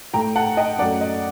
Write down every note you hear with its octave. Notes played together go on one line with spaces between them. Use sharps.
A2 A3 G5 A#5
F#5 A5
D#5 G5
F#2 F#3 A3 D5 F#5
D#5